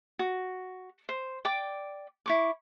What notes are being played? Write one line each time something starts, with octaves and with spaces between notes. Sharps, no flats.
F#4
C5
D5 G5 D6
E4 C#6 D6